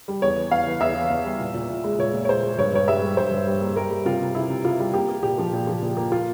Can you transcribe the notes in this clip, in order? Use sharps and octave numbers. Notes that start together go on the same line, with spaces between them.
G3
E2 C#5
E3
E2 F5
E3
E2 E5
E3
E2
G3
A#2
A#2
A#2
G#3
A#2 C#5
A#2
C#5
G#3 C5
G#3
G2 C#5
G2 C#5
G3 E5
G3
G2 C5
G2
G3
A#3
G3 A#4
G3
C3 F4
C3
C3 E4
C3
C3 F4
G3
A#3 G4
A#3
A#2 G4
F3
A#2
F3
A#2
A#3
F4